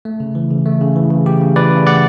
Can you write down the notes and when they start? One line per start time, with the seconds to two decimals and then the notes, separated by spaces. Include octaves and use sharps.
0.05 A3
0.20 C#3
0.35 E3
0.51 C#3
0.66 A3
0.81 C#3
0.96 E3
1.11 C#3
1.26 A3 G4
1.41 C#3
1.56 E3 B4 D5
1.71 C#3
1.87 A3 D5 F#5